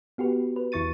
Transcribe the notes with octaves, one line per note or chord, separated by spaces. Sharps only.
B3 F#4 G4 B4
B4
E2 E3 E4 C#6 A6 D#7